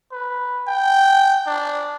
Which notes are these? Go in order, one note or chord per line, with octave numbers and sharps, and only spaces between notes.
B4
G5
D4